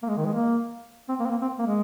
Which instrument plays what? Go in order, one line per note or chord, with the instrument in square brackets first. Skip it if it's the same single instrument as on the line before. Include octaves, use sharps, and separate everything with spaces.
[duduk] A#3
G#3
D#3
G#3
A#3
C4
A#3
C4
A#3
C4
A#3
G#3